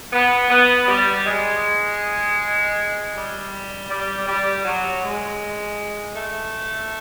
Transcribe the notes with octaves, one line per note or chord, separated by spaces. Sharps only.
B3
B3
G3
G#3
G3
G3
G3
F#3
G#3
A3